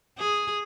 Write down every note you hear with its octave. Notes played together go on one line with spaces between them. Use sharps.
G#4